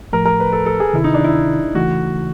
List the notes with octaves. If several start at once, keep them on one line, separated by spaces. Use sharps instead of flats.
A2 F3 A3 A#4
A#4
B4
A4
A4
G#4
D2 C3 D#3 E4
D#4
D4
E4
D#2 C#3 E3 A3 F#4